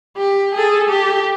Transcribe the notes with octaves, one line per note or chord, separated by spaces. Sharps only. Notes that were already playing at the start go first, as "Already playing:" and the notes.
G4
G#4 A4
G4